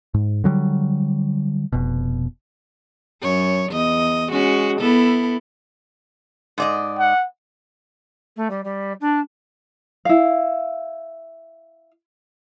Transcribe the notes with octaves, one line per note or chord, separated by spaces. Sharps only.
G#2
D3 F#3 G3
F1 B2
F#2 C#5
E2 D#5
G#3 C#4 F#4
B3 E4 A4
G#2 D5 D#5
F#5
A3
G3
G3
D4
E4 F5